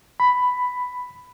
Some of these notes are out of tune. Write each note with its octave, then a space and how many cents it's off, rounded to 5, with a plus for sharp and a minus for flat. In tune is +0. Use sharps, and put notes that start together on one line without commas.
B5 +5